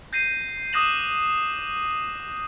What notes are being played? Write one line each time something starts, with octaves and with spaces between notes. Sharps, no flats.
G6 A#6 C7 D#7
D6 D#6 F#6 A#6 E7 F#7